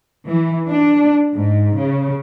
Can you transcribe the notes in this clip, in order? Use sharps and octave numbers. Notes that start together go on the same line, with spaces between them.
E3
D4
G#2
C#3